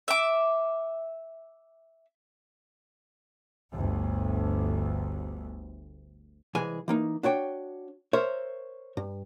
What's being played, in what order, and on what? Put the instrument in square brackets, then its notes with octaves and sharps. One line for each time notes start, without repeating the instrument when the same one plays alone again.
[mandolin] E5 D6
[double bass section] G1 D2
[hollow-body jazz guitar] C2 E3 G#3 G#4 G#5
E3 A#3 D#4
D4 F#4 C#5 G5
A#4 C5 C#5 E5
G2